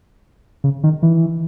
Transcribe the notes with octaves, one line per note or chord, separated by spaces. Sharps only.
C#3
D#3
E3